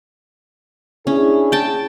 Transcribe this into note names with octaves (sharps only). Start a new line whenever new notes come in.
C#4 D4 E4 G#4
G5 A5